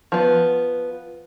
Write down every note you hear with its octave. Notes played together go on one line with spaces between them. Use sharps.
F3 B3